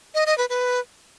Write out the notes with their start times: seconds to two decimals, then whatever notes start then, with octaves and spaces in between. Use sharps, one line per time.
0.15 D#5
0.26 D#5
0.38 B4
0.49 B4